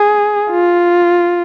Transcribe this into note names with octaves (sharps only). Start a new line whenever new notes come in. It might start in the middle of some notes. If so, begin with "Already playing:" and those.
Already playing: G#4
F4